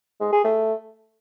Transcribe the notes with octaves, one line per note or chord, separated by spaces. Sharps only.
G#3
G#4
A3